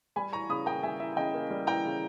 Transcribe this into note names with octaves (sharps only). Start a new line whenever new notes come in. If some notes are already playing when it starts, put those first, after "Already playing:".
G3 G#5 B5
E3 A#5 C#6
C#3 B5 D#6
A#3 G5 A#5
G3 E5 G#5
E3 E5
C#3 D#5 G5
A#3
G3
E3 G5 A#5
C#3